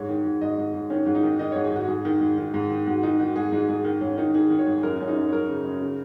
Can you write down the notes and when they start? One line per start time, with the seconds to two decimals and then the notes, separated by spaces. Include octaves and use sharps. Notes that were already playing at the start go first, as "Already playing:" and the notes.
Already playing: G#2 C#5
0.09 D#3
0.25 G#2
0.41 G#2 D#5
0.58 G#2
0.74 G#2
0.90 D#3 C#4
1.06 G#2
1.15 D#4
1.23 D#3
1.39 D#3 D#5
1.52 C#5
1.56 G#2
1.64 G#4
1.72 G#2 F#4
1.88 G#2 G#4
2.05 D#3
2.21 G#2
2.38 D#3
2.54 G#2
2.70 D#3
2.86 G#2 F#4
3.03 D#3 D#4
3.19 D#3 F#4
3.36 G#2 G#4
3.52 G#2 D#4
3.68 G#2 G#4
3.85 D#3
4.01 G#2 C#4
4.17 D#3 D#4
4.34 D#3 G#4
4.50 D#3
4.59 C#5
4.67 G#2
4.78 G#4
4.83 F#2 A#4
4.95 G#4
5.00 F#2 C#4
5.08 D#4
5.16 F#2 G#4
5.28 C#5
5.32 F#2 A#4
5.48 C#3
5.65 F#2
5.81 C#3